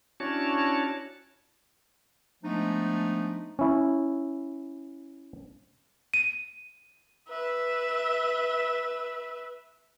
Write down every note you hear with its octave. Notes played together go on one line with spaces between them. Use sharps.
C#4 D4 E4 F#4 C#5 A5
F3 G#3 A3 B3 D4 D#4
C#4 E4
D#7
B4 E5